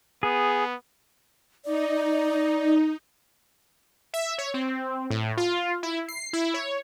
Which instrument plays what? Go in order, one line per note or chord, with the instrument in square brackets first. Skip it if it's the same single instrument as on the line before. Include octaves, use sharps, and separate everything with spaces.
[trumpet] B3 [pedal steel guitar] G#4
[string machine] D#4 [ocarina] D5
[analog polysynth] E5
C#5
C4
A2
F4
E4
C7
E4
C#5